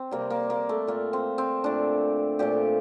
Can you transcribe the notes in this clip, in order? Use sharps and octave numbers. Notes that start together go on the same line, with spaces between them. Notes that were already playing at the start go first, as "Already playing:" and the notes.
Already playing: C4
C3 G3 A#3
A#3
A#3
A3
A#2 A3 A#3
C4
C4
A#2 A3 D4
A#2 F3 A3 G4